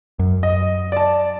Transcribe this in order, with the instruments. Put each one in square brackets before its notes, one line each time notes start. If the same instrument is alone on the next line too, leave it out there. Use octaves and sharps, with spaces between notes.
[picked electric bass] F#2
[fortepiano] D#5
D5 A5